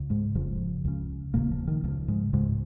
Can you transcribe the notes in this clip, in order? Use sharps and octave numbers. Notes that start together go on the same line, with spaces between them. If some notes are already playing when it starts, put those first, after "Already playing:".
Already playing: C#2 C#3
G#2 G#3
F1 F2 C#3 F3
C#2 C#3
F1 D#2 A#2 C#3 A#3
F3
D#3
C#2 C#3 F3
G#2 G#3
C#2 G#2 C#3 G#3